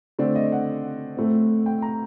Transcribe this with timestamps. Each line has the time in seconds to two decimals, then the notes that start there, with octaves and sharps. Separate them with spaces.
0.19 D3 A3 C4 D5
0.36 D#5
0.52 F#5
1.17 A2 A3 C4
1.66 G5
1.82 A#5